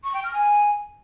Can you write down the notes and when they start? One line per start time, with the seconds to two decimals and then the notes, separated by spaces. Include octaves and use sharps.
0.04 C#6
0.14 G5
0.24 F6
0.34 G#5